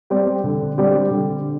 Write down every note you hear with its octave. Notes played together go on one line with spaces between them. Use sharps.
G3 C4 G4 D5
D3
G3 C4 G4 D5
D3